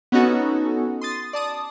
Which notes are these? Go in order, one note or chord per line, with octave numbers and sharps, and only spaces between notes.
B3 C#4 D#4 F#4 A4
C6 D#6 A6
D5 A5 D#6